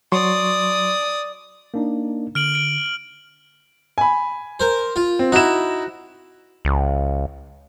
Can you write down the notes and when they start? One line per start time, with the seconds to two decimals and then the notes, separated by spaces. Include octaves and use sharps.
0.12 F#3 D5 C6 C#6 D#6
1.74 A#3 D4 D#4
2.35 D3 F6 D7 F#7
2.55 D7
3.98 G#5 B5
4.60 A#4 C5
4.96 F4
5.19 C4
5.32 D#4 E4 F#4 E7
6.65 C#2